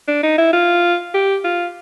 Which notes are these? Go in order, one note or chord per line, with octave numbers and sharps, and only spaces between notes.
D4
D#4
E4
F4
G4
F4